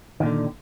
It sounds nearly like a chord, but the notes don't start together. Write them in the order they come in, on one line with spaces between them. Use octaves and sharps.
D#3 A#2 D3